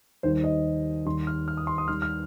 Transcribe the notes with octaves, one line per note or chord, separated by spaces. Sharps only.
D#2 D#3 G3 C5
D#5
D#2 D#3 G3 C6
F6
F6
D#6
C6
D#6
D#2 D#3 G3 F6
F6